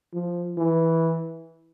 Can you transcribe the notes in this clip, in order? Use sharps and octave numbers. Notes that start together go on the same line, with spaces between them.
F3
E3